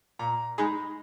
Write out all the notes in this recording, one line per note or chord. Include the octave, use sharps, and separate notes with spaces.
A#2 A#5
G#3 D#4 G#4 B5